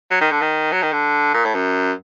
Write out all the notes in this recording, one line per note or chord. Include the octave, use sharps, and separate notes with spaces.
F#3
D#3
D3
D#3
F#3
D#3
D3
A#2
A2
F#2